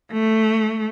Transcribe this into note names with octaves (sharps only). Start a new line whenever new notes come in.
A3